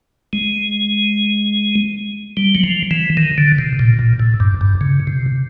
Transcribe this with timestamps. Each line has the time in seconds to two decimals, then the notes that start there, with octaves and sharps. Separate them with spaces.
0.33 G#3
2.37 G3
2.55 F#3
2.64 F3
2.91 E3
3.17 D#3
3.38 D3
3.58 C3
3.79 A#2
3.99 A#2
4.20 A2
4.40 G2
4.61 G2
4.81 C#3
5.07 C3